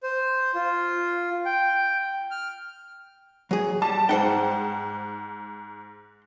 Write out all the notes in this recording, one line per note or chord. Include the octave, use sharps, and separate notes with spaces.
C5
F4
G5
F6
F#3 G#4
G3 A5
G#2 C5 F#5 G5